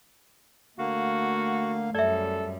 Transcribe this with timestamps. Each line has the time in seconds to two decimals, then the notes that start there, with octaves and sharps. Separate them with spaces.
0.79 D3 A3 A#3 F#4 F5
1.95 F#2 G3 A4 D5 E5